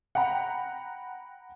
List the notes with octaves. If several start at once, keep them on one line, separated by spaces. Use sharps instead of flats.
F#5 G5 A#5 B5